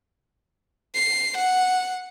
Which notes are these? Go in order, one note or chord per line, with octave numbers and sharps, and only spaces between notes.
C7
F#5